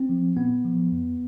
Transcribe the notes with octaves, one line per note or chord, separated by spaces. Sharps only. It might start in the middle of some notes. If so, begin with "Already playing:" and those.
Already playing: C4
F3
A#2 B3
F3
F2